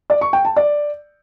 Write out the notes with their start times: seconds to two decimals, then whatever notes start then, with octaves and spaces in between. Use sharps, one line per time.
0.10 D5
0.21 C#6
0.33 G5
0.45 A5
0.56 D5